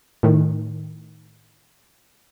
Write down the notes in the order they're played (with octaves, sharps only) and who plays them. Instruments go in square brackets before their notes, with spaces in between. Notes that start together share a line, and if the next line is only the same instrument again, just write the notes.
[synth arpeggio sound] A2 D#3